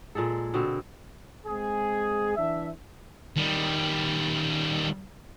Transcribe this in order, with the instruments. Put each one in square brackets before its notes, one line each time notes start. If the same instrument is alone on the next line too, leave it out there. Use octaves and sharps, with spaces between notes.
[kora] A#2 G#3 G#4 A4
B2 D3 C4
[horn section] G#3 C4 G#4
E3 D4 E5
[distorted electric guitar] D#3 G3